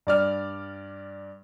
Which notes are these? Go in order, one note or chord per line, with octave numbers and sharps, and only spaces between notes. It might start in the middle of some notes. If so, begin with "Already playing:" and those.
G2 D5 F6